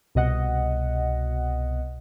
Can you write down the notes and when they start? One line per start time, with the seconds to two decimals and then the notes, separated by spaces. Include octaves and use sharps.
0.15 C2 B2 D#5 F#5